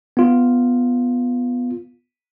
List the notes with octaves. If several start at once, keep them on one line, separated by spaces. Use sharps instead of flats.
B3 F4